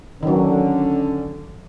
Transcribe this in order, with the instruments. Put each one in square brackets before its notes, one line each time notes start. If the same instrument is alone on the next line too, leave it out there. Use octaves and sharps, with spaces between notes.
[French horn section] D3 C#4 [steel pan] D#3 F#3